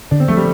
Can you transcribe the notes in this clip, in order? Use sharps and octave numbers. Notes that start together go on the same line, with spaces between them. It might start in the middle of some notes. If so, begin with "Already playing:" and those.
D3 D4
C4
F3 A3
G3